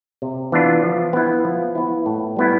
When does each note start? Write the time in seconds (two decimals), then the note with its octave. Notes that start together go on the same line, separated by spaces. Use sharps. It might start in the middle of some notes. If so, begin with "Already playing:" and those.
0.22 C3
0.52 E3 B3 D4 F4
0.83 F3
1.13 B3 E4
1.45 F3
1.75 B3 E4
2.06 A2
2.37 G3 B3 E4